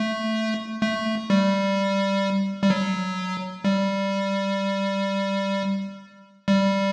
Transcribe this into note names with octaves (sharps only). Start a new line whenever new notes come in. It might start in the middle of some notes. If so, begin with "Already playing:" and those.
Already playing: A3
A3
G3
G3
F#3
G3
G3